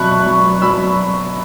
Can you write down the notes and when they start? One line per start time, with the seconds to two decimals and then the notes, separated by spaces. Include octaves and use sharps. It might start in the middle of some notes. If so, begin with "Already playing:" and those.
Already playing: B2 F#3 E5 A5 B5 C#6 F#6
0.26 F#3
0.62 F#3 B5 E6